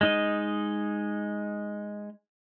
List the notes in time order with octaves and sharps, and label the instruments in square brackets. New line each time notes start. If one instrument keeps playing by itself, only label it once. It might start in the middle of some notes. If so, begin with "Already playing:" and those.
[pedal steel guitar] G#3 D#4 D#5